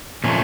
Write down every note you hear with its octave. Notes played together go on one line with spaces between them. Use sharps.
A#2 F3 A3 C#4